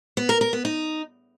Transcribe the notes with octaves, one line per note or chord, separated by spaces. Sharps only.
B3
A#4
A#4
B3
D#4